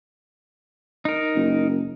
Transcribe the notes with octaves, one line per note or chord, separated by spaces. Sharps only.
D#4 A#4
F#1